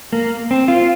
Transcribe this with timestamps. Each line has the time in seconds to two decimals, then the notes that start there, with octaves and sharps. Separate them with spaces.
0.13 A#3
0.51 C4
0.68 F4